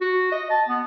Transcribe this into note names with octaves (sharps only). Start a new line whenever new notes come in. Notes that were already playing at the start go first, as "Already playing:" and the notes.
F#4
D#5
A5
B3